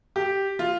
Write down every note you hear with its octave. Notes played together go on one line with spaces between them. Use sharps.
G4
F4